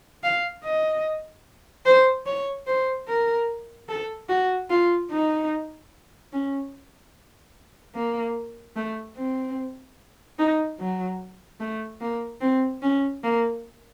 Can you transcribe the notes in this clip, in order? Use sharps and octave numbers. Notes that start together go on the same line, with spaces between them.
F5
D#5
C5
C#5
C5
A#4
A4
F#4
F4
D#4
C#4
A#3
A3
C4
D#4
F#3
A3
A#3
C4
C#4
A#3